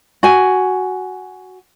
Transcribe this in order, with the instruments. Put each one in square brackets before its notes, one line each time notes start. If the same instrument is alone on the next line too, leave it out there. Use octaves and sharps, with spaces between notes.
[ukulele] F#4 G#5